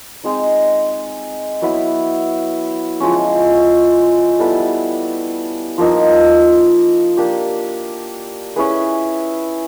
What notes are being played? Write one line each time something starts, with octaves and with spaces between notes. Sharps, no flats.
G#3 C4 D#4
F#3 B3 E4
F3 G#3 C#4
G3 B3 E4 A4
F3 A#3 D#4
A#3 D4 G4
C#4 E4 G#4 B4